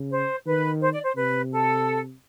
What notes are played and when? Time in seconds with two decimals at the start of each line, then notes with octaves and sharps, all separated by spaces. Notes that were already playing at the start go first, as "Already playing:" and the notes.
Already playing: C#3
0.11 C5
0.45 D#3 B4
0.81 C5
0.92 D5
1.04 C5
1.16 C3 B4
1.50 A4